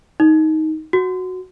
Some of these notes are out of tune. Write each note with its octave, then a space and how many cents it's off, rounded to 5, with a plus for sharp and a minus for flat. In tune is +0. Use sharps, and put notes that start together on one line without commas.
D#4 +15
F#4 -5